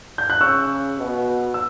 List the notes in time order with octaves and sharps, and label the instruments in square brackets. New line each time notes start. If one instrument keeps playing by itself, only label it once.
[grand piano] G6
F#6
[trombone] C#3 [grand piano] C#6 E6
[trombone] B2
[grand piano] E6